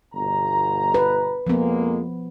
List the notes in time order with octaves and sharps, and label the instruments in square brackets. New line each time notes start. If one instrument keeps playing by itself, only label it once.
[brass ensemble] G1 B2 A#5
[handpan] B4
[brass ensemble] F2 G#3 A#3 [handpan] F3 B3